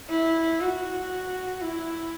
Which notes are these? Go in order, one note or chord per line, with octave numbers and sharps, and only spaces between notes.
E4
F#4
E4